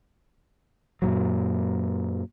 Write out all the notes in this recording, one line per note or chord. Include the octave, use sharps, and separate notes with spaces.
F#2 A#2 F#3